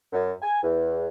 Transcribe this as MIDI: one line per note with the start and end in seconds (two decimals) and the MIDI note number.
0.13 0.32 42
0.42 0.59 80
0.63 1.07 40